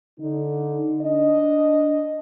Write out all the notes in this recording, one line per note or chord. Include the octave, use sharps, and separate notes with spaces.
D3 D#4
D4 D#5